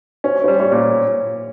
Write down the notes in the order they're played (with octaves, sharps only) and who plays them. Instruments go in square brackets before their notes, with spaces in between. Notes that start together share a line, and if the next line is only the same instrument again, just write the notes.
[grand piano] C#4 [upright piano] C5
[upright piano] C#5
[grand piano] G3 [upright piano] C5
[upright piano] C#5
[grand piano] A#2